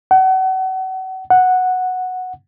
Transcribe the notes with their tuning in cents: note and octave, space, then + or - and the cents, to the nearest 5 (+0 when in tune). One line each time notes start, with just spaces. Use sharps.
F#5 +35
F#5 -5